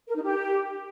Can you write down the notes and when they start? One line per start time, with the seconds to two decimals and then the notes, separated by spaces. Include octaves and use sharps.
0.08 A#4
0.15 D#4
0.22 G4